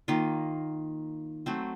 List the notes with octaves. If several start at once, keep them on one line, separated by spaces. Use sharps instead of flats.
D#3 A#3 F4
F#3 A3 C4